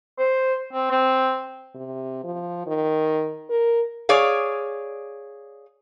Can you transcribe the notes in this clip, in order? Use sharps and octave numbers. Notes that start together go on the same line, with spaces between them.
C5
C4
C4
C3
F3
D#3
A#4
G#4 C#5 D5 F5